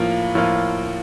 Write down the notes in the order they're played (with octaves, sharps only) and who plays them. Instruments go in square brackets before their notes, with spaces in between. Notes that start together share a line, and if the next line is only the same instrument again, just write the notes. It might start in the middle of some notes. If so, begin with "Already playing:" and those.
Already playing: [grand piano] A2 F3 A#3 F4
A2 F3 A#3 F4